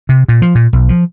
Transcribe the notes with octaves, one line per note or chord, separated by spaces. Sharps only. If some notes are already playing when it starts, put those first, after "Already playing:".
C3
A#2
F3
A#2
B1
F3